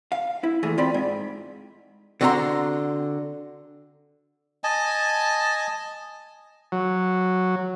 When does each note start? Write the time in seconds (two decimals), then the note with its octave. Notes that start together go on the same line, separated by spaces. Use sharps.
0.12 F5
0.43 E4
0.63 A#2 E3 A3 G#4
0.78 C4 F4 D5 G5 B5
0.94 G#2
2.21 D3 C4 F#4 F#5 A#5 C6
4.64 D#5 G#5 A5
6.72 F#3